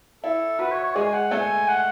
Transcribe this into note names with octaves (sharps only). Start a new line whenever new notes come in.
E4 A4
F#4 B4
C#5
C#5
G#3 G#4 G#5
F#5
A3 A4 G#5
F#5